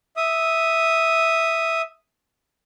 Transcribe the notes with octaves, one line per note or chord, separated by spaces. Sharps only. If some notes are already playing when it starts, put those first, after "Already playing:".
E5 D#6